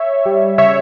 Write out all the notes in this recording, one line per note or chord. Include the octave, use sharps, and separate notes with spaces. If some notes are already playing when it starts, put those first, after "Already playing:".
Already playing: C#5 E5
G3
C#3 C#5 E5